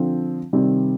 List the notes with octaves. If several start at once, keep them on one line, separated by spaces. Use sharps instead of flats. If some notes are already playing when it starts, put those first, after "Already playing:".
Already playing: D3 F3 C4
C3 D#3 G3 C4